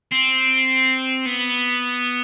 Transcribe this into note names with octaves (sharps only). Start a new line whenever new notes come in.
C4
B3